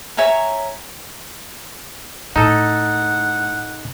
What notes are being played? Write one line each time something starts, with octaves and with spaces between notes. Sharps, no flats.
C#5 E5 G#5 A#5
A2 D#4 A4 F#5